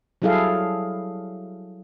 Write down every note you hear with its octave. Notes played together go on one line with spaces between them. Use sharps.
F#3 G3 E4 G#4 A4 F5